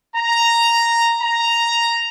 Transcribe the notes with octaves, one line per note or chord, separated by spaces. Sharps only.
A#5
A#5